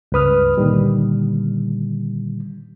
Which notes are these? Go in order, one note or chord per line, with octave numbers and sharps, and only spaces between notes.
C#2 G2 B4 D#6 F6
A#2 D3 D#3 G3